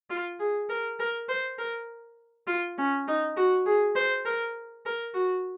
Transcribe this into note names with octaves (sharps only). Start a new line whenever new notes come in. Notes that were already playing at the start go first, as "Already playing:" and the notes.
F4
G#4
A#4
A#4
C5
A#4
F4
C#4
D#4
F#4
G#4
C5
A#4
A#4
F#4